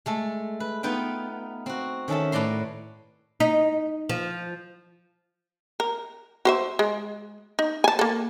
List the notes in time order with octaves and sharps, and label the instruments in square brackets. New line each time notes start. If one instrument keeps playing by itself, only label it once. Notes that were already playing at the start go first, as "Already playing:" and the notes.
[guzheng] G#3 A3 A4
B4
B3 D#4 F4 B4 G5
C4 F#4
D#3 C#4 A4 E5 A5
A2 B4 D5 A#5 C6
[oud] D#4
F3
[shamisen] A#4
F#4 C5 E5
G#3
D#4
G#5 A5
A#3 A4